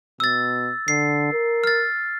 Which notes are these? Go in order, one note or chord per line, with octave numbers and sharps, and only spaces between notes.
B2 E6 A6
D3 C7
A#4
F6 A6